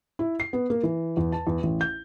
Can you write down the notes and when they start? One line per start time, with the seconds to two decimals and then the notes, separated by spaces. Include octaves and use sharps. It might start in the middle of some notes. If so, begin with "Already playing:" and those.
0.19 E4
0.40 C7
0.53 B3
0.70 A#3
0.83 E3
1.17 E2
1.32 A5
1.47 E2
1.63 A1
1.81 G6